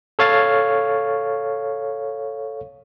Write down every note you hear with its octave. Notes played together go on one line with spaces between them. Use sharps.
A4 C#5 F5 A6